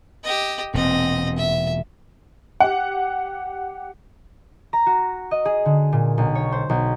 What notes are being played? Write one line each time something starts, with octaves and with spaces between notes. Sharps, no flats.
G4 D#5
E1 A#2 C4 D#5
E5
G4 F#5
A#5
F#4
D#5
G#4
D3
A#2
B1
C#5
C5
B1